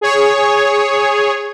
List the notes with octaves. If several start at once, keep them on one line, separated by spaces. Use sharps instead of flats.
G#4 C#5